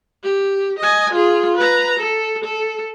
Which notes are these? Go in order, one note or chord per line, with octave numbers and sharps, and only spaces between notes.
G4
D#5 G#5
F4 G#4
B4 A#5
A4
A4